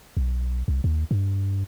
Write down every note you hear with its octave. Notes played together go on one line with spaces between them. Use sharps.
B1
C2
D#2
G2